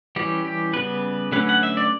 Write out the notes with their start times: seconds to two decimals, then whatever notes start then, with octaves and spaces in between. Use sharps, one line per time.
0.16 E3 G3 C#4 G4
0.45 G4
0.73 C#3 G3 B3 B4
1.32 D3 F#3 A3 C#4 B4
1.49 F#5
1.63 E5
1.77 D5